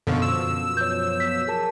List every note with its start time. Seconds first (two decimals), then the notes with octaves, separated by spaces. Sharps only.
0.07 F#2 B2 D3 F3 A4 C#6
0.22 E6
0.77 B4 C#5 G6
1.20 B6
1.48 G#4 A#4 A5